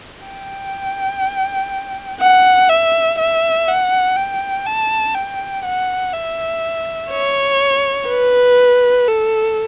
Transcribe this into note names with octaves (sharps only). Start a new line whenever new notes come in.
G5
F#5
E5
E5
F#5
G5
A5
G5
F#5
E5
C#5
B4
A4